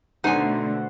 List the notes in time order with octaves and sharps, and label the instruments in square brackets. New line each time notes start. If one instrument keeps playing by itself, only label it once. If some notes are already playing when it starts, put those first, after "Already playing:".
[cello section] B2 D3 A3 [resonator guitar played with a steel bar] D#4 G#5 [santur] C5 F#5